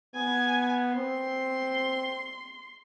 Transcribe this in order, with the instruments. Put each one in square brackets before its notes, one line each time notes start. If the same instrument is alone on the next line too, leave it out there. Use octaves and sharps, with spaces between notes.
[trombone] B3 [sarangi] G#5
[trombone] C4 [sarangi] C6